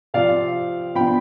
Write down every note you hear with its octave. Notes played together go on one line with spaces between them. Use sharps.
C3 F3 C4 D5 F5
F3 B3 D4 G5 B5